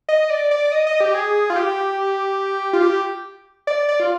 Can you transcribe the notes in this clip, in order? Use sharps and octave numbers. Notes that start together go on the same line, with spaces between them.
D#5
D5
D5
D#5
D#5
G4
G#4
F4
G4
F4
G4
D5
D5
F4